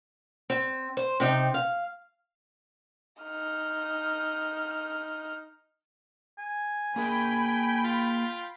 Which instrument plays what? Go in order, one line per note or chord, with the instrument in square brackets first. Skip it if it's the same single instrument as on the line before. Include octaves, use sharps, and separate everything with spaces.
[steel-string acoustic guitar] C4
C5
C3 C4 D#4
F5
[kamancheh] D#4 F6
[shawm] G#5
[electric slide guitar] A#3 G#4 [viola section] G5 B5
[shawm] F4